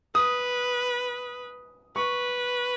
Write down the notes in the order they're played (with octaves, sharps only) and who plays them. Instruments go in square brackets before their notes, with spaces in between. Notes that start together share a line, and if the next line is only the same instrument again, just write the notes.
[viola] B4 [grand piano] D#6
[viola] B4 [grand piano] C#6